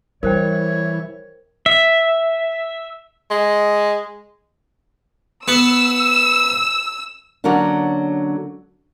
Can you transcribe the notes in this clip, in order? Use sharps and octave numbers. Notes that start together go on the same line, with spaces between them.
E3 G3 A#4 C5 C#5 G5
E5
G#3
B3 E6
D3 F#3 A#3 C#4 D4